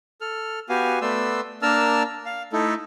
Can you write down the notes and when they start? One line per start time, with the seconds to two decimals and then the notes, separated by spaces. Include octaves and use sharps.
0.21 A4 F6
0.69 B3 F#4 G4 F5 G#5
1.02 A3 B3 D5 C6 E6
1.62 A#3 D4 A#4 A5 E6 F6
2.26 F5
2.53 A3 D#4 E4 A4